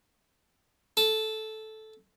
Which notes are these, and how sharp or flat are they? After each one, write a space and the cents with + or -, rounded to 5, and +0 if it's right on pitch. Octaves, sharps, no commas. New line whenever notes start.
A4 -10